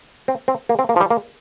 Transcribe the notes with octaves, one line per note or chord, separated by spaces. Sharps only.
C4
C4
A#3
C4
A#3
F3
G3
A#3